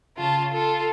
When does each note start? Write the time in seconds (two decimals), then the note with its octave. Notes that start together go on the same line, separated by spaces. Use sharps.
0.17 C#3 F4 A5
0.51 F4 A4